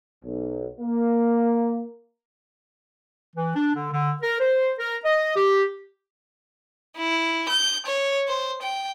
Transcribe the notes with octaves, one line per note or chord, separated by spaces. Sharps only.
B1
A#3
E3
D4
D3
D3
A#4
C5
A#4
D#5
G4
E4
G6
C#5
C5
G5